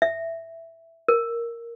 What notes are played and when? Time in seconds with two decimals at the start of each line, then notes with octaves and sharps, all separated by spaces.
0.02 E5
1.08 A#4